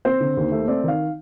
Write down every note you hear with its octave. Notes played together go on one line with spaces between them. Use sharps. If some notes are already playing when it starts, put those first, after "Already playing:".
C4 C5
D3
D#2
A3
C4 D5
D#3 F5